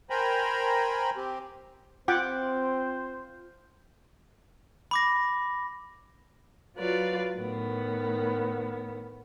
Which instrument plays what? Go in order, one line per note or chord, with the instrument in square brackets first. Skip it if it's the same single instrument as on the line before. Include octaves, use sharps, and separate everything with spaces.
[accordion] A#4 C5 G5 G#5 A#5 B5
C4 G4
[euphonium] C4 [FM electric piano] F4 [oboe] C5 [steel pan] F#5 G5 D6
[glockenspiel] B5 D6 A#6
[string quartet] F#3 F4 B4 D5 F5
A2 D#3 B3